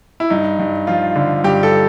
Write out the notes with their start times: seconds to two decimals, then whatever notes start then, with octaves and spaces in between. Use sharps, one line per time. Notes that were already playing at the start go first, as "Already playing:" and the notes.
0.20 E4
0.30 G2 D#4
0.59 G2
0.87 F3 F4
1.16 D3
1.44 G2 G4
1.63 A4